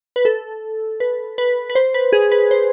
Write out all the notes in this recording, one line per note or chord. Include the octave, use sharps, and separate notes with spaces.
B4
A4
B4
B4
B4
C5
B4
G#4
B4
C5